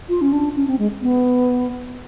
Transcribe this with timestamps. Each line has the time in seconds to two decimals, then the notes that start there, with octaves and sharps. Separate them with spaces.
0.09 F4
0.22 C#4
0.33 D4
0.56 C#4
0.68 C4
0.79 G#3
1.02 B3